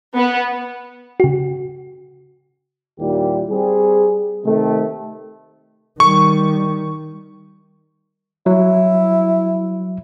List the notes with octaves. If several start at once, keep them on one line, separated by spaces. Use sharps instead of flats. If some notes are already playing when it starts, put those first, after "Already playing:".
B3
C#3 F#4
D#2 A#2 G3 E4 G4
G3 C4 G#4
C3 D#3 A3
D#3 G3 C#6
F#3 E4